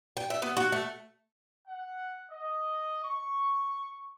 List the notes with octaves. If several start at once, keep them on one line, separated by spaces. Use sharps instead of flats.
G5
E5
B3
F#4
A3
F#5
D#5
C#6